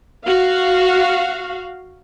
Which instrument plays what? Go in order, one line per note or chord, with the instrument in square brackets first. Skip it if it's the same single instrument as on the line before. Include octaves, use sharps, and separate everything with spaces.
[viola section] F#4 F5